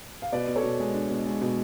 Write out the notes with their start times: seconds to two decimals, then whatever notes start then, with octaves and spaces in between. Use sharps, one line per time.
0.22 F5
0.33 B2 B4 D5
0.48 B2
0.56 A4 C#5
0.63 B2
0.80 G#3
0.94 D4
1.10 B2
1.26 G#3
1.41 B2